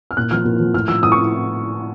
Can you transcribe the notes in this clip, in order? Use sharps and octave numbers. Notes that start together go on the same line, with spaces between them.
F6
A#2 F#6
F3 F6
A#2
F3
A2 F6
F3 E6
A2 D#6
C#6